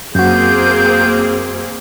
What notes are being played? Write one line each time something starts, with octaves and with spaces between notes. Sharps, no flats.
F#2 A#3 C4 F#4 G#4 G6